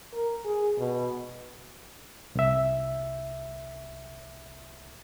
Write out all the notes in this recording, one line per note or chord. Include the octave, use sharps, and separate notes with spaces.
A#4
G#4
B2
C2 E5